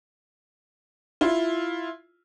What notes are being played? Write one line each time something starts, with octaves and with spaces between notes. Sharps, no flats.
E4 F4